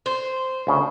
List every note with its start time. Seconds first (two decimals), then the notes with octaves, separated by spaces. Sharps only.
0.06 C5
0.67 D2 C#3